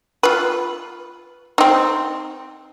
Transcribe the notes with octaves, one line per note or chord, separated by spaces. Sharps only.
F4 B4
C4 D#4